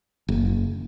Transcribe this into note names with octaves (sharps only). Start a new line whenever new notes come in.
F#1